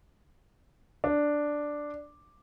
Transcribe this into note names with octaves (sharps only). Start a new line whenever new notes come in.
D4